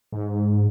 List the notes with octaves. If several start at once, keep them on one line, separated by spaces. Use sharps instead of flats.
G#2